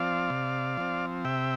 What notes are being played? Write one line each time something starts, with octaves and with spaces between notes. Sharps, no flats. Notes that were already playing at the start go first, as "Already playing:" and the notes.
Already playing: F3 C4 D5 F5
C3
F3 C4
C3 E5 G5